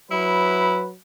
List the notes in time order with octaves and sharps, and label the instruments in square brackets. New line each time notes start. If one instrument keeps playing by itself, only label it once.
[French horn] F#3 [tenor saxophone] E4 [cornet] B4